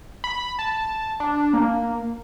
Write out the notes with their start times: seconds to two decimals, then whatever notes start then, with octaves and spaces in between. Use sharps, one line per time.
0.24 B5
0.59 A5
1.20 D4
1.53 A#3